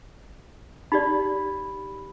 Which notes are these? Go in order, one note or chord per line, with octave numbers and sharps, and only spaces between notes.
D#4 G4 D5 B5